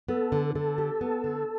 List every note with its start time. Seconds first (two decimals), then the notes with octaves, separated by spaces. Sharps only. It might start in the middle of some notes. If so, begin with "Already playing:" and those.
0.08 B3 A4
0.32 D3
0.55 D3 A4
0.78 G4
1.01 B3
1.24 D3